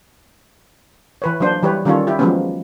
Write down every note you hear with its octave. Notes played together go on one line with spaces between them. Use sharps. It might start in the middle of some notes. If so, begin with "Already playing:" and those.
E3 B4 C#5
F#3 A#3 D4 C5
E3 G3 G4 B4 C#5
D#3 G3 C#4 F4 A4 C#5
E4 G4
F3 F#3 G#3 A#3 B3 C#4